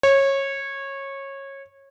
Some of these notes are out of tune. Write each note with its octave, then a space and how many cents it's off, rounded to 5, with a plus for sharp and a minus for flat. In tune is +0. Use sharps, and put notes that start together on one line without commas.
C#5 -20